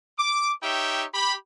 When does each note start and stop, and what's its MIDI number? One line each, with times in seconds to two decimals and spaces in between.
0.19 0.52 86
0.63 1.04 63
0.63 1.04 67
0.63 1.04 73
0.63 1.04 76
0.63 1.04 79
1.14 1.34 67
1.14 1.34 83